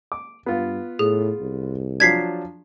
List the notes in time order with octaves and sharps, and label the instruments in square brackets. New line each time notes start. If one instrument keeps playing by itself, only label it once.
[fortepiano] D6
[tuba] G2 [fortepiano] B3 F4
[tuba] A2 [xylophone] G#4
[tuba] C2
[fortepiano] F3 F#3 D4 [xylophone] G#6 B6 C7